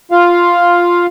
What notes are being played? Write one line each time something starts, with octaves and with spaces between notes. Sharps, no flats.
F4 F5